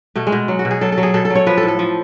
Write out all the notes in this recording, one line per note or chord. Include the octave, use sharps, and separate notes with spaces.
B2 A3
G#3
B2
F#3
F#4
B2
G#4
F#3 A4
A4
F#3
G#4
B2 A4
A4
F#3
C#5
F3 B4
A4
A2
A4
F3